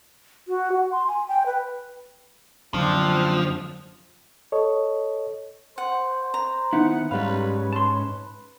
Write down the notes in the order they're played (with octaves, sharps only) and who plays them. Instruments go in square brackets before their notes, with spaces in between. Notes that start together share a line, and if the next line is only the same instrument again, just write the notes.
[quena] F#4
F#5
C6
G#5
G5
B4
[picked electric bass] F#2 D3 [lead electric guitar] F3 [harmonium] C4 D4 F4
[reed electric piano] A4 C#5 D#5
[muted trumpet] C5 [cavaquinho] F#5
[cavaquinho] A#5
[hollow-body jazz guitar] D#3 D#4 E4 [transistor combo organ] B3 F#5
[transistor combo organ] G#2 C#4 [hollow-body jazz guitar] G3 F5 [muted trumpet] B4
[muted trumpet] B4 [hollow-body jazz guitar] A5 C6